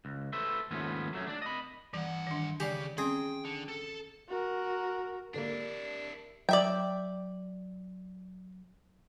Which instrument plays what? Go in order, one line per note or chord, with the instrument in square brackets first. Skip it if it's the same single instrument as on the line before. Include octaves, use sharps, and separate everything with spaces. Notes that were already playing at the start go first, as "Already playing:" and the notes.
[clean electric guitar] C#2
A4 B4 C5 E5
D#2 G#2 F3 A3 B3 C#4
F#3 A3 C#4
D4 D5
D#5 B5
[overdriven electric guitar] G2 F#5 [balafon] E3
[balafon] D#3 D4
[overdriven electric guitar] C#3 [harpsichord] G4 [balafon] D5 G5 G#5
[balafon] C4 C#4 [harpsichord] G#4 [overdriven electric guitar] G5
[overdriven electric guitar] D3
A4
[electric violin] F#4 A#4
[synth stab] G#2 D3 A#3 [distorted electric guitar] D4 E4 [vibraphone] G4 A#4 D5
[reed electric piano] F#3 [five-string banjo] D5 E5 G5